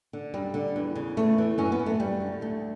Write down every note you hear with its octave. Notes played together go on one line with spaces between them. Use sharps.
D3
F#2 G3
D3
E2
C#3
E2 A3
E3
F#2 C#4
B3
F#2
A3
F#2 G3
D3
D2 A3